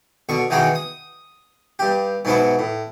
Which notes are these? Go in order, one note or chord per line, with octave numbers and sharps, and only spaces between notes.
B2 D3 C#6
B2 D#3 E3 D#4 F#4 G#4
D#6
G2 G4
G#2 B2 F#3 B3 E4
A2